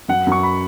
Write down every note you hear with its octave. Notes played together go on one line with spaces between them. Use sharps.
F#2 F#5
F#2
C#6
B5